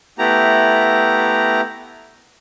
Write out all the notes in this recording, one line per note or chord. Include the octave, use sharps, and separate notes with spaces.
A3 B3 E4 G4 A#5